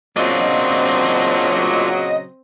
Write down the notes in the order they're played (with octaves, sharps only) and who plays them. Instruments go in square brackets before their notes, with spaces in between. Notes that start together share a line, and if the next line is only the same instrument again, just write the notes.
[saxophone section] A#2 C#3 F#3 [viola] C4 [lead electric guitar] D4 F4 [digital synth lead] D#5